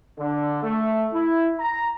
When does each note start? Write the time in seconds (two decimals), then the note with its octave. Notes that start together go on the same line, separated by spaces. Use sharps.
0.18 D3
0.63 A3
1.12 E4
1.59 A#5